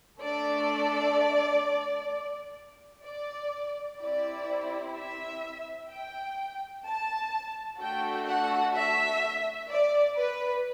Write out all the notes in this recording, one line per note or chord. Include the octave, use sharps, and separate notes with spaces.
A3 D4 A4 D5
D5
C4 E4 G4 D5
E5
G5
A5
A3 D4 F#4 A4 G5
F#5
E5
D5
B4